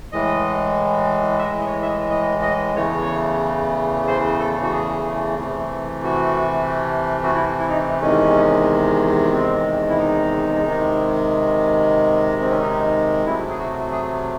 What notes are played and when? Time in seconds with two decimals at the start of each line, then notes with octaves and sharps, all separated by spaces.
0.12 A2 E3 G#3 D#5
1.39 E5
1.44 D#5
1.60 D#5
1.67 C#5
1.82 E5
1.88 D#5
2.10 D#5
2.42 D#5
2.75 E2 C#3 E3 A3 C#5
4.07 C5
4.39 A4
4.62 F#4
4.72 G#4
5.38 C3 E3 A3
6.04 F#4
7.24 F#4
7.35 E4
7.59 E4
7.68 D#4
8.01 E2 C3 D#3 G#3 C#4
9.32 C4
9.89 E4
9.98 D#4
10.64 C3 D#3 G#3
12.42 C4
12.51 C#4
12.61 D#4
13.26 C3 F#3 A3 E4
13.50 G#4
13.59 F#4
13.92 G#4